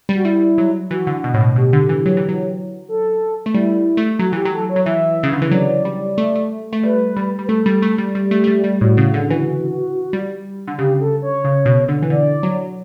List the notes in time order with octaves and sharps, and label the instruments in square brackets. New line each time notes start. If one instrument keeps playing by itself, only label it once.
[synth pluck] G3
[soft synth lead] F#4
[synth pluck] G3 [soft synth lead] E4
[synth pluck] F#3
[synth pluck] E3 [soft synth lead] F#4
[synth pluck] D3
B2
A2
B2
[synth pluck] B2 [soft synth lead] G4
[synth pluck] D3
E3
F#3
E3
F#3
[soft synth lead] A4
[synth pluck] A3
[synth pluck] G3 [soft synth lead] E4
[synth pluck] A3
[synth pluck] F#3 [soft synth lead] F#4
[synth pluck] E3 [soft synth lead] G4
[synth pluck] F#3
[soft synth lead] A4
C#5
[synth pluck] F#3
[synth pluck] E3 [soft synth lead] E5
[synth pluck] C#3
D3
E3
[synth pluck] F#3 [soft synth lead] D5
[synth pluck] G3
A3
A3
A3
[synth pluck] G3 [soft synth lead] B4
[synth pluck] G3
G3
[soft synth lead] B4
[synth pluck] A3 [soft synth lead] A4
[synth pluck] G3
A3
G3
[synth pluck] G3 [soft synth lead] G4
[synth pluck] A3
A3
G3
G3
[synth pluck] A2 [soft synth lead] F#4
[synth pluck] C#3
D3
E3
G3
D3
[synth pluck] C#3 [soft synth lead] G4
[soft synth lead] A4
C#5
[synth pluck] C#3
B2
D3
E3
[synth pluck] D3 [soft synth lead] D5
[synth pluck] F#3